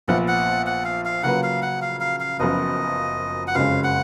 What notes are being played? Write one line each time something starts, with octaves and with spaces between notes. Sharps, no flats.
A#1 A#2 F3 B3 F#5
F#5
F#5
F5
F5
C#3 F#3 A#3 F4 B4 F#5
F5
F#5
F5
F5
F5
F#1 F#2 F3 B3 D#5
F#5
F#1 F2 C#3 G#3 C#4 F5
F#5